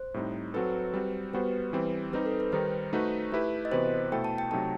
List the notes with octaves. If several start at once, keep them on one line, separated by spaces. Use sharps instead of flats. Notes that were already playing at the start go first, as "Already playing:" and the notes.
Already playing: C5
A2 G3 C4 D#4
F#3 C4 F#4 A4 B4
G3 C4 F#4
G3 B3 F#4 B4 C5
E3 G3 C4
G3 C4 D#4 G4 B4
A4
B4
D#3 G3 D#4 C5
A3 D#4 F#4 B4
A3 E4 G4 B4
D#5
C3 E3 B3 F#4 B4 C5
B2 A3 E4 A4 C5 G5
A5
G5
C3 F#3 A3 D#4 A5